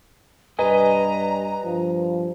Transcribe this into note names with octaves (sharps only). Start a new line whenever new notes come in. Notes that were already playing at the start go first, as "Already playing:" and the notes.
G2 G3 B4 D#5 G#5 A#5
G2 F3